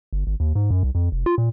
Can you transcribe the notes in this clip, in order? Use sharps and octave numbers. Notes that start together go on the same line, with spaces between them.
G1
G#1
D#2
G#2
F#2
C2
F2
F1
F4
A#2